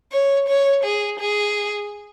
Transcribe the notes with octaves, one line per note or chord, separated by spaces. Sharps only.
C#5
C#5
G#4
G#4